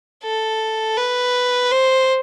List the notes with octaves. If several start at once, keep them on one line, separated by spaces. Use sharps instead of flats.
A4
B4
C5